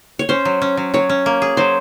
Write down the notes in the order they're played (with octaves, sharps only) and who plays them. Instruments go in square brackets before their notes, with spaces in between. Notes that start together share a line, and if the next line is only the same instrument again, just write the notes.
[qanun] C#5
[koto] C#4 [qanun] C5
[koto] F#3
C#4
F#3
[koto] F#3 [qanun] C#5
[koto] C#4
A#3
G#4
[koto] F#3 [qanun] C5